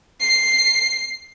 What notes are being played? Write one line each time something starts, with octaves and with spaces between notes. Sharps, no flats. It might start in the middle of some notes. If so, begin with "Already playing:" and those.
C7